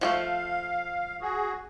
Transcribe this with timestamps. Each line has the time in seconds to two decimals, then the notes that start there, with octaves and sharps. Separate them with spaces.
0.01 F3 G#3 A3 F5
1.21 F#4 G#4